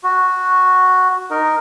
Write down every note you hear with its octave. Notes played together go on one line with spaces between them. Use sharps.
F#4
D#4 A#4